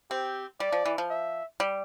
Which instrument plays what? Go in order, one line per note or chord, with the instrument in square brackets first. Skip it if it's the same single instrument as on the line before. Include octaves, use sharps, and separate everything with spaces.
[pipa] C4 [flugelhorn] G4
[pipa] G3 [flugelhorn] D5
[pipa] F3
E3
F3
[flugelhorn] E5
[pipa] G3